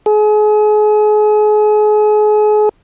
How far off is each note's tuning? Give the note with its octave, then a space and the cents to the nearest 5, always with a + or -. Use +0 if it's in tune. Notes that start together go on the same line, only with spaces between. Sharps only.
G#4 +35